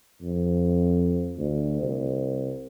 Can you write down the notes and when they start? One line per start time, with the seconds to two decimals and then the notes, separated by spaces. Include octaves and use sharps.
0.22 F2
1.38 D2
1.82 C2